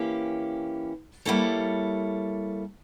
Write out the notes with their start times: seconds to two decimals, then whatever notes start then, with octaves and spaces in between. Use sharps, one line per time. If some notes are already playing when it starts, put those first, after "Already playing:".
Already playing: E3 A#3 C#4 G4
1.25 G3 A#3 E4 A4 C#5